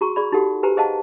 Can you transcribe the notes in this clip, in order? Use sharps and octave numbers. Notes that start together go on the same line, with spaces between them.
F#4 G#4 A#5 C#6
G#4 D5 B5
D#4 F#4 G4 A4 F#5
G4 B4 C5 G#5 A#5
G#4 C5 D#5 F5 F#5 A5